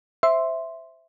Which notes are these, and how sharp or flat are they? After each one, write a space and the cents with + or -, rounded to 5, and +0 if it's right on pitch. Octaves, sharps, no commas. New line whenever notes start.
C5 -5 E5 +0 C6 +0